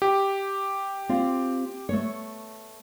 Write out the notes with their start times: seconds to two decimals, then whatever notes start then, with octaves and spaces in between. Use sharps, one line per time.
0.02 G4
1.09 C4 F4 F5
1.89 A3 B3 C#5